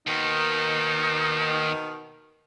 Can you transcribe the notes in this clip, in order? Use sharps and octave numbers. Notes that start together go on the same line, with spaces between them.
D#2 B2 D#3 D#4